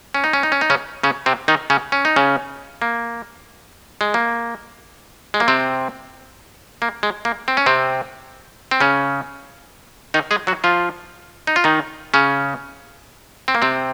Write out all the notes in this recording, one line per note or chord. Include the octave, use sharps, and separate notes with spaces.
C#4
D#4
C#4
D#4
C#4
D#4
C#3 C#4
C#3 C#4
C3 C4
D#3 D#4
C#3 C#4
C#4
D#4
C#3 C#4
A#3
G#3
A#3
G#3
A#3
C3 C4
A#3
G#3
A#3
C4
C#4
C3 C4
C4
C#3 C#4
D#3 D#4
G#3 G#4
F#3 F#4
F3 F4
D#4
F4
D#3 D#4
C#3 C#4
C4
A#3
C3 C4